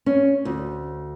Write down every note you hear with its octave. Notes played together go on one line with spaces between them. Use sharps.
C#4
D2